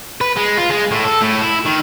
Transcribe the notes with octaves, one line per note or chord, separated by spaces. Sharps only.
B4
G#3
F4
G#3
A2
A4
A2
E4
D#3